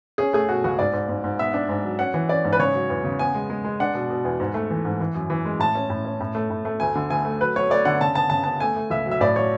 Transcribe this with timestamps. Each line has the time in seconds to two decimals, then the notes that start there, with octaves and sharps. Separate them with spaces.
0.18 C#4 G#4
0.33 A3 G#4
0.49 B2 F#4
0.64 C#2 F#4
0.79 G#2 D5
0.93 G#2
1.09 G#2
1.24 G#2
1.39 B3 E5
1.54 D4
1.69 G#2
1.84 F#3
1.99 C#4 F#5
2.14 E3
2.29 C#4 D5
2.44 G#2
2.53 B4
2.59 C#3 C#5
2.74 F#3
2.89 E2
3.04 C#3
3.19 B3 G#5
3.35 G#3
3.50 G#3
3.64 G#3
3.80 D4 F#5
3.94 B2
4.10 B2
4.25 E2
4.40 G#2
4.54 A3
4.70 E3
4.85 G#2
5.00 E3
5.15 F#2
5.30 E3
5.45 G#3
5.59 A2 A5
5.75 C#4
5.90 A2
6.05 C#4
6.21 A2
6.35 A3
6.50 A2
6.65 A3
6.80 D2 G#5
6.95 D3
7.10 D2 G#5
7.25 A3
7.40 F#3 B4
7.56 F#3 C#5
7.70 A3 D5
7.85 D3 F#5
8.01 C#3 A5
8.15 B3 A5
8.30 C#3 A5
8.44 B3 A5
8.60 A3 G#5
8.76 A3
8.90 C#2 E5
9.06 F#3
9.11 E5
9.21 A2 D5
9.36 F#3 C#5